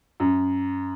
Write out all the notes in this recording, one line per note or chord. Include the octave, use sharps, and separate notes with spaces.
F#2